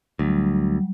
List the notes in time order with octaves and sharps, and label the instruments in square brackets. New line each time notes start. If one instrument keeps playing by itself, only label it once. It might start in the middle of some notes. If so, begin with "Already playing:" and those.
[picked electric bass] D2 [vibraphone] F#3 G3